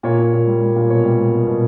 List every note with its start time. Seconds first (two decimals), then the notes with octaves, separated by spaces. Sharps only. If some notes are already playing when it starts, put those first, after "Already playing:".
0.03 A#2 C#5
0.19 A#2
0.33 A#2
0.47 G3
0.62 G3
0.76 A#2
0.89 B2 C#5
1.04 G3
1.19 G3
1.32 B2
1.47 B2